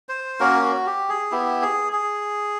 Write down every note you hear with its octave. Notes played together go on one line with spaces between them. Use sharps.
C5
A#3 C#4 F#4 A#4
F#4
G4
G#4
B3 E4 G4
G#4
G#4